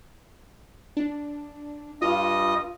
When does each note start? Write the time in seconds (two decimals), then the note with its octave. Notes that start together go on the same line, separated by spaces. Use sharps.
0.97 D4
2.02 G2 F4 D#5 D#6